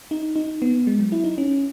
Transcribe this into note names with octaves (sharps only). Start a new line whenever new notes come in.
D#4
D#4
B3
G#3
F#3
E4
D#4
C#4